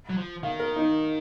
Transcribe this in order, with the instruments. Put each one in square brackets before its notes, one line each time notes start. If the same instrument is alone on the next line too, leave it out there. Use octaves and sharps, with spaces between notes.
[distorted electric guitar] F#3
F3
[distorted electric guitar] D#3 [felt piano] F5
[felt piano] A#4
D#4